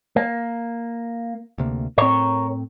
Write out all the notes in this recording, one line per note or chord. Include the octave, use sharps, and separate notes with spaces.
A#3
D2 C3 A#3
A2 C4 A#4 C#5